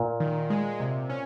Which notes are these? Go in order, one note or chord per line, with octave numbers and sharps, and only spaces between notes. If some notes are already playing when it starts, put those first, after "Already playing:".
Already playing: A#2
D#3
G#3
C3
C#4